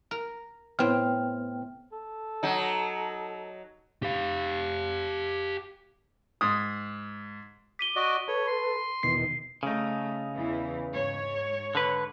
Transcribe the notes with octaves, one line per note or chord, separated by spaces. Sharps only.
A#4
A2 B3 C4 G5 F6
A4
F#3 D#4
G4 F5
G#2 D#6
D6 B6 D#7 G7
F#4 D5 D#5
A4 B4 C#5
C6
E2 B2 D#3 C7
C#3 A3 D#4
E2 E3
G#2 C#5
D3 B4